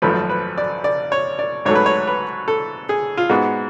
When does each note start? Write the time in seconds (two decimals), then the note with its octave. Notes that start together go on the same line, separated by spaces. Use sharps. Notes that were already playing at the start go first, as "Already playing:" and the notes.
0.02 G#1 F#2 F3 A3 B4
0.30 B4
0.58 D5
0.84 D5
1.12 C#5
1.39 D5
1.65 G#2 F#3 A3 C#5
1.75 B4
1.86 C#5
2.07 B4
2.48 A4
2.89 G#4
3.17 F4
3.29 G#2 G#3 B3 F#4